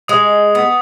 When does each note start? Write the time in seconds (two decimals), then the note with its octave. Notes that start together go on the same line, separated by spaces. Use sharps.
0.08 G#3 D#6
0.55 B3